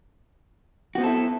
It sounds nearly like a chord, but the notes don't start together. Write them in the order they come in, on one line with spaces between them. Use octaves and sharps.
F#4 B3 C4 A4 E4